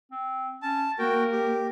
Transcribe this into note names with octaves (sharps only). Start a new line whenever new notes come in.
C4
C#4 A5
A#3 F#4 A#4 G5
G4